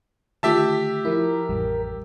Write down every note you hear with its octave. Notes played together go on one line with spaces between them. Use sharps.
D3 D#3 A3 F4 G4 E5 A5
F3 E4 A#4
A1 F2 G3